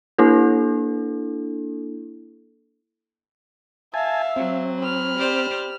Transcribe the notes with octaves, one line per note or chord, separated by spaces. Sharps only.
A#3 D4 E4 A4
E5 F5 G#5 A5
F#3 C4
B5 F6
G4 C5 D5